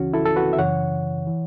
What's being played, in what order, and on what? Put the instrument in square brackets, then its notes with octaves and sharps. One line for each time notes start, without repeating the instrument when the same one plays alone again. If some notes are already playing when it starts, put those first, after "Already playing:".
Already playing: [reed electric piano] C#2 C#3 E3 C#4 F#4
E4 A4
A4
F#4 B4
E5
F#2 C#3 E3 C#5 F#5
E3